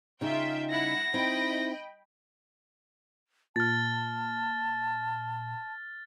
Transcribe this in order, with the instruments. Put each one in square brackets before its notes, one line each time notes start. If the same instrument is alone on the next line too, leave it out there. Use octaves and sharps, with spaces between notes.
[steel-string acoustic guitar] C#3 D#4 [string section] F4 E5 G5
[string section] G3 E4 F#5 [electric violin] A#6
[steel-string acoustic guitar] C4 D#4 E4 [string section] D#5 G5 B5
[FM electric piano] A#2 [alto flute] A5 [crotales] F6 A6